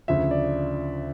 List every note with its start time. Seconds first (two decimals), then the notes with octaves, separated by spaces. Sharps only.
0.08 D2 C#3 F3 E5
0.31 D5